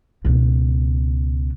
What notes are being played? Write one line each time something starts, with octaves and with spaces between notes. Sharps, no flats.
C#2 B2